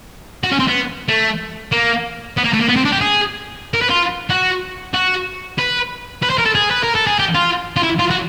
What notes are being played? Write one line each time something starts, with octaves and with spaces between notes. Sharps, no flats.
F#4
C#4
C4
B3
A3
A#3
B3
A#3
A3
A#3
B3
C4
D4
G4
G#4
A#4
B4
F4
F#4
F#4
B4
B4
C5
A#4
A4
G#4
B4
A#4
A4
G#4
G4
F4
F4
E4
F4
F#4